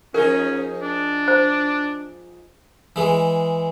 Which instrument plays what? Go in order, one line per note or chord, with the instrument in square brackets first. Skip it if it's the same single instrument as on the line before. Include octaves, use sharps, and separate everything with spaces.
[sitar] F3 D#4 G#4 [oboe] C#4 [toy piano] A#4
[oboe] D4
[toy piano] C5
[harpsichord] E3 G#3